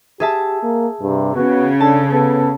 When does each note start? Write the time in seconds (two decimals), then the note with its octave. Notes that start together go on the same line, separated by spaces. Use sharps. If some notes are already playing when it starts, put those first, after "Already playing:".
0.20 G4 G#4 E5 A5
0.63 A#3
1.01 G2 C3
1.35 C#3 B3 F#4
1.80 D4 A4 A5
2.11 B3 A4